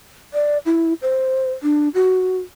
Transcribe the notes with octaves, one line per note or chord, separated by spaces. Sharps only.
D5
E4
C5
D4
F#4